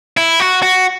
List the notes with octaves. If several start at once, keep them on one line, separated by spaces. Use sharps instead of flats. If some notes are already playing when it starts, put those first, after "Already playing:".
E4
F#4
F#4